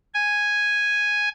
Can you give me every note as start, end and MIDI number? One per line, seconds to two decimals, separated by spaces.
0.14 1.29 80